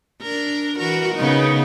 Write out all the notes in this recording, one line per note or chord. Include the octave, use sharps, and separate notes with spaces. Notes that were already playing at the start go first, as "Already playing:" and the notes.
D4 A#4
E3 F#4 A#4
C#3 B3 D#4